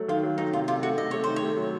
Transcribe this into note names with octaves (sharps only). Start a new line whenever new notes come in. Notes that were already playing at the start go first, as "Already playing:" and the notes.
Already playing: F#3 A3
D#3 F4
F#3
D#3 D#4
C3 F4
C3 F4
A3 F#4
C3 D#5
A3 C#5
D#3 C5
C#5
A3
F#3